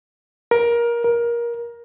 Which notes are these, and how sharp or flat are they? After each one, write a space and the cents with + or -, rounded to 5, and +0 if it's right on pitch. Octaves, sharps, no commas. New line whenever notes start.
A#4 +20
A#4 +20